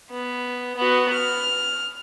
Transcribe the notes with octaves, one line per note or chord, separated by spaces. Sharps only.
B3
B3 F#4
F6